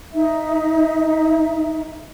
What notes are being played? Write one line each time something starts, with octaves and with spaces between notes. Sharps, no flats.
D#4 E5